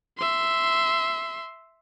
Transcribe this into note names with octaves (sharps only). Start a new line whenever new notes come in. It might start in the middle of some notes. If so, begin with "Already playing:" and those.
E5 C6